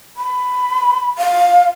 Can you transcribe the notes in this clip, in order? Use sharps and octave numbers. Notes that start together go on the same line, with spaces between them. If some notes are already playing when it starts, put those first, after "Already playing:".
B5
F5